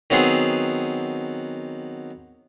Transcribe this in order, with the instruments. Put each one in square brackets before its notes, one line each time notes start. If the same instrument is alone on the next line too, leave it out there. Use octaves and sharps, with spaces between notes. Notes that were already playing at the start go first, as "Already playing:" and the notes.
[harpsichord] D#3 F#3 B3 C4 G#4